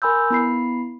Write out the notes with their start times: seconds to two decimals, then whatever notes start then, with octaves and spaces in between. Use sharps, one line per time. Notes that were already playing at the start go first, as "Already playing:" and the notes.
0.02 A#4 G#5 B5 C6 E6 G6
0.30 B3 E4 B5 C7